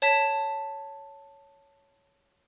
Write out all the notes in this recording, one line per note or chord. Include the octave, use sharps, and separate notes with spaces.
C#5 A5 G#6 B6